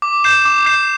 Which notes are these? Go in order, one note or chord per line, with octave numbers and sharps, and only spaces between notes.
D6
G6 C7 E7
D6
G6 C7 E7